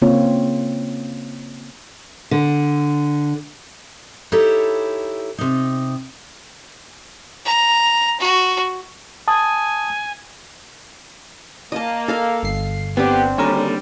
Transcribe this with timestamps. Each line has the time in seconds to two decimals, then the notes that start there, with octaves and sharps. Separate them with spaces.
0.02 C#3 A#3 C4 F4 C#5
2.31 D3
4.32 D#4 E4 G4 A4 C#5
5.38 C3 D#4
7.45 A#5
8.20 F#4
9.28 G#5 A5 D#6
11.72 A#3 D#5 A5
12.08 A4 F5
12.43 G1 C7
12.97 B3 C4 D4 G4
13.38 D#2 D3 G3 C#4 A#4